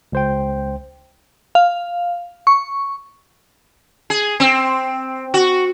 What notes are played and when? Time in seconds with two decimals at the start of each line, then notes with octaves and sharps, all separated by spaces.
0.12 C#2 C5 G5
1.55 F5
2.47 C#6
4.10 G#4
4.40 C4
5.34 F#4